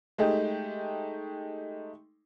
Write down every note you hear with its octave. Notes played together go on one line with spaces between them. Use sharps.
G#3 A3 D#4 G4